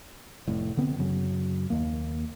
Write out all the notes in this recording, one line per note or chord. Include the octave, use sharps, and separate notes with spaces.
F1 A2
D3 B3 C4
F#2 C#3 F#3
D#2 A#3